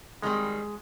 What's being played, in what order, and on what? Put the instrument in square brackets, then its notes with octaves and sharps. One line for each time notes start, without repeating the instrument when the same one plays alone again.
[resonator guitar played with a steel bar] D#3 G3 C4 [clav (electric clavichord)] G#3